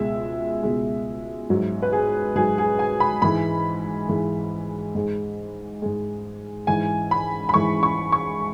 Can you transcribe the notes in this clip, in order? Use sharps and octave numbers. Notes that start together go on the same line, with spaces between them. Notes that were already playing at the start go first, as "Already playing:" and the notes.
Already playing: C#2 B2 G#3 E5
C#2 B2 G#3
G#2 F#3
B4
G#4
G#2 F#3 G#4
G#4
G#5
B5
G#2 E3 G#3 B5
G#2 E3 G#3
G#2 G#3
G#2 G#3
G#2 E3 G#3 G#5
B5
B5
G#2 E3 G#3 C#6
C#6
C#6